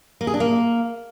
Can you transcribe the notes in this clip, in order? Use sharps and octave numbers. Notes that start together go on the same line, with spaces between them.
A#3
G#4
D4
A#3